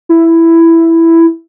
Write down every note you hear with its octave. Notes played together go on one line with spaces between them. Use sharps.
E4